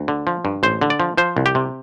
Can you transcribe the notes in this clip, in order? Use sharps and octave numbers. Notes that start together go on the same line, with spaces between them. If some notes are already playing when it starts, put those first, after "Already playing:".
Already playing: D2
D3
F3
G2
A1 C5
D3
D5
F3
F3 C5
C2
G4
C3